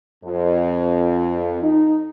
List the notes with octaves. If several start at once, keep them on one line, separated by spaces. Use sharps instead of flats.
F2
D#4